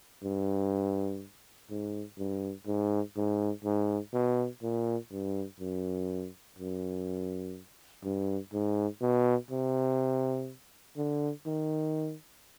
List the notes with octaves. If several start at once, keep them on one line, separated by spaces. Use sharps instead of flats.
G2
G#2
G2
G#2
G#2
G#2
B2
A#2
G2
F#2
F#2
G2
G#2
B2
C3
D3
D#3